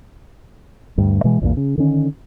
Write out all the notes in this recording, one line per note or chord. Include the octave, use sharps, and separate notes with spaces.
D2 G2 G3
B2 E3 G#3
A#1 E2 G2 A#2
C#3
D3 D#3 C#4